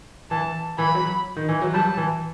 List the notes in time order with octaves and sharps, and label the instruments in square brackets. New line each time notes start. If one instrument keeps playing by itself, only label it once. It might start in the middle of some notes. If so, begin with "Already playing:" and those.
[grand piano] E3 [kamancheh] A5
[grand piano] E3 [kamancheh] B5
[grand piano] F#3
D#3
E3
F#3
[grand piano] G3 [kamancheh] A5
[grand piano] E3